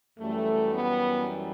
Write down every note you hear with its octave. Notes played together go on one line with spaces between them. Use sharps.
F#2 E3 G3 A3
B3